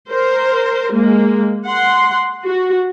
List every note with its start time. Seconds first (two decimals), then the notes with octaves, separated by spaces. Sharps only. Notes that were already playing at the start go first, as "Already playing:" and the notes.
0.10 A#4 C5
0.93 G#3 A#3
1.67 F#5 C6
2.44 F#4